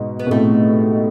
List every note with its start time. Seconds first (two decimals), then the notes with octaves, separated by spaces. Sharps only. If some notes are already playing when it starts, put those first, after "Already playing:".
Already playing: G#2 B2
0.19 B3
0.27 B2
0.31 A2 C3 A3